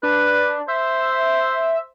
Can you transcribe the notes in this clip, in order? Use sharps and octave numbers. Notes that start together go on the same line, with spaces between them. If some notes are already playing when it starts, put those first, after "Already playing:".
D4 B4
C5 E5